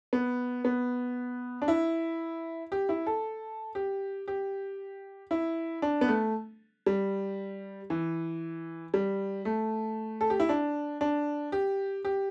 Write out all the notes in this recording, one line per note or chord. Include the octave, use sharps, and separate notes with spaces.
B3
B3
D4
E4
G4
E4
A4
G4
G4
E4
D4
B3
A3
G3
E3
G3
A3
A4
G4
E4
D4
D4
G4
G4